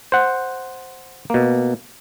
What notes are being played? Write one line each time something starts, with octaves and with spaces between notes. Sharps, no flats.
C5 F#5
B2 A#3